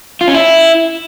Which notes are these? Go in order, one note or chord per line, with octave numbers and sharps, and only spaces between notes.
F4
C#4
E4